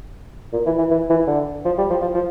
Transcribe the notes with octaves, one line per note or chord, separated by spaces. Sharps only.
A#2
E3
E3
E3
E3
D3
F3
G3
F3
F3
F3